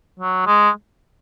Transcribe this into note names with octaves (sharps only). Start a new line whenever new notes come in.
F#3
G#3